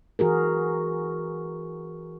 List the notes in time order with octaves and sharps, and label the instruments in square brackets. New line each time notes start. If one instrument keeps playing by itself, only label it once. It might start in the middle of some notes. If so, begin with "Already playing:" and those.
[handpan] E3 F#4 G#4 A#4